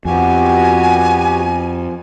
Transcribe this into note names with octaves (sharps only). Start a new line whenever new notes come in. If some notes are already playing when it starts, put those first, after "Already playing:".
F2 B3 F#4 G4 G#5